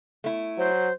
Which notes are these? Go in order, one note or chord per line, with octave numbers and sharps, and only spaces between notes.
A3 E4
F#3 C5